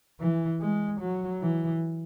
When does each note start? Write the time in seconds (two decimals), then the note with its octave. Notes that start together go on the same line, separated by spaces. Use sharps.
0.20 E3
0.61 G#3
1.01 F#3
1.41 E3